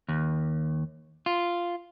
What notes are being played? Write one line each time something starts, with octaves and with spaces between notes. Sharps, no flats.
D#2
F4